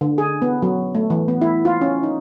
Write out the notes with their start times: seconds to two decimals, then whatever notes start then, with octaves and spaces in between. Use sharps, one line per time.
0.01 D3
0.18 G#4
0.42 B3
0.62 F#3
0.95 A3
1.10 E3
1.28 B3
1.42 E4
1.65 F4
1.81 C#4
2.03 D#4